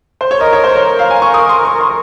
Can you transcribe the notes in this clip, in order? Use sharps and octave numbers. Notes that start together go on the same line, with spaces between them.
C5
C#5
A#4 D#5
C#5
C5
C#5
A#4
F5
G#5
C#6
D#6
C6
C#6
C6